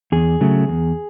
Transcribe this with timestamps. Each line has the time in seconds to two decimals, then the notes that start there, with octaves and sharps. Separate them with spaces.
0.12 E2 G#4
0.41 C#3 F#3 A3
0.68 E2